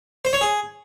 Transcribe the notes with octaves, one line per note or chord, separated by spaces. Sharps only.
C5
C#5
G#4